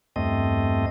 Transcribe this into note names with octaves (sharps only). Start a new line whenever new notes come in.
E2 G2 A3 C4 D#5